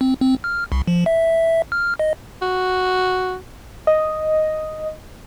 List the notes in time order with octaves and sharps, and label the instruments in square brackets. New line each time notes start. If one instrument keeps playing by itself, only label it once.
[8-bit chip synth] C4
C4
F6
C2
F3
E5
F6
D#5
[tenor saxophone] F#4
[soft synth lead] D#5